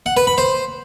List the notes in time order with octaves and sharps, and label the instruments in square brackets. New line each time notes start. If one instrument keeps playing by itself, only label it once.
[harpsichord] F#5
B4
B5
C5